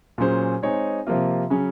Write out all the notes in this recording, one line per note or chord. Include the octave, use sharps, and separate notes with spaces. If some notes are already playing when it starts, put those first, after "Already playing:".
A#2 F#3 C#4 G#4 C5
G#3 C4 D#4 G#4 C#5
C3 F3 A#3 F4
C#3 F#3 C#4 G#4